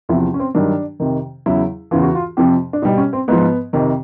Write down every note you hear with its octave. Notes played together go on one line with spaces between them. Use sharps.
E2 C3 F3 E4
C#4
C4
G2 D#3 F#3 D4
F2 C3 D#3
E2 C#3 F#3 E4
E2 C#3 E3 F4
F#4
F4
F2 C3 F3 G4
D4
B2 G3 D#4
C#4
C4
G#2 F3 B3
F2 C3 D#3